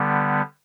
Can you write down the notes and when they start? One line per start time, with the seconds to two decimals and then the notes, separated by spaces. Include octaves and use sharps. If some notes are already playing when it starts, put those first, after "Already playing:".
Already playing: D3 G3 B3